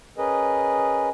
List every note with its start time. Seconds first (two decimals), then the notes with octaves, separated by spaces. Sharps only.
0.18 C#4 G#4 A#4 B4 D#5